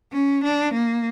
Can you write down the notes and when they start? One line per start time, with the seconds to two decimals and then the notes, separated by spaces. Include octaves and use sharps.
0.13 C#4
0.44 D4
0.74 A#3